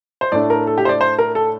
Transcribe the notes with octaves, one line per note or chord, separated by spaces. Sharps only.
C5
A2 A3 D4 D5
A#4
A4
G4
C5
D5
C5
A#4
A4